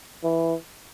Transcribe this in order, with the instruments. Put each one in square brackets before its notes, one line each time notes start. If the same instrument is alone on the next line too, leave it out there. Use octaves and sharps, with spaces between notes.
[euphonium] E3